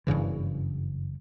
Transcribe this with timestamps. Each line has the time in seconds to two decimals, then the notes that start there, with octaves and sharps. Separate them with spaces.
0.07 F#1 G2 C#3 E3